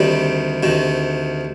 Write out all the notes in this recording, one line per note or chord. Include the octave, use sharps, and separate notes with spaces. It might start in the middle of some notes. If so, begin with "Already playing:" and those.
Already playing: D2 C3 D#3 G3
D2 C3 D#3